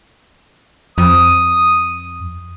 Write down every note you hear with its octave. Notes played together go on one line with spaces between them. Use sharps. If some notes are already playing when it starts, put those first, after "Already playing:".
F2 D#6